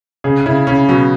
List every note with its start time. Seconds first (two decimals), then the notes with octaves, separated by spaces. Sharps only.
0.24 C#3 G#4
0.46 C#3 E4
0.67 C#3 C#4
0.89 B2 F#3